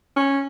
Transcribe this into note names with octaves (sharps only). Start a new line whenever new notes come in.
C#4